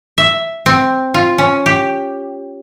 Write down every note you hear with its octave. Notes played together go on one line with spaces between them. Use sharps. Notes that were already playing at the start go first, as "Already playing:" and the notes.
E5
C4
F4
C#4
G4